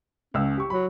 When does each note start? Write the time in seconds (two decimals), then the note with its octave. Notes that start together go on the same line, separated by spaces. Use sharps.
0.34 C#2 C#4 F5 E6
0.58 G4 C#6
0.70 F#3 B5